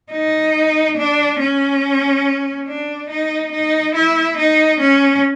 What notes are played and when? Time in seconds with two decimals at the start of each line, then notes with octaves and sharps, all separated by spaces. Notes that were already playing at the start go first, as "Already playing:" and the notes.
0.12 D#4
0.97 D4
1.40 C#4
2.67 D4
3.10 D#4
3.52 D#4
3.95 E4
4.38 D#4
4.80 C#4